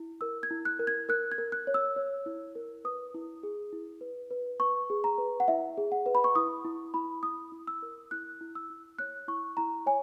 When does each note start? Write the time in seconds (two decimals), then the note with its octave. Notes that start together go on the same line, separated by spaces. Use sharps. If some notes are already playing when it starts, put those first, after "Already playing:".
Already playing: E4
0.21 A#4 E6
0.43 G#6
0.51 E4
0.65 F#6
0.79 A#4
0.87 G#6
1.09 A#4 F#6
1.32 G#6
1.38 A#4
1.52 F#6
1.67 C#5
1.74 E6
1.96 C#5
2.26 E4
2.55 A#4
2.84 B4 D#6
3.14 E4
3.43 G#4
3.72 E4
4.01 B4
4.31 B4
4.60 B4 C#6
4.90 G#4
5.04 A#5
5.18 B4
5.40 F#5
5.48 E4 E5
5.78 G#4
5.92 F#5
6.06 B4
6.15 B5
6.24 C#6
6.35 E4 D#6
6.65 E4
6.94 E4 B5
7.23 E4 D#6
7.52 E4
7.67 E6
7.82 A#4
8.11 E4 F#6
8.41 E4
8.55 E6
8.70 E4
8.99 C#5 F#6
9.28 E4 C#6
9.57 E4 A#5
9.86 C#5 G#5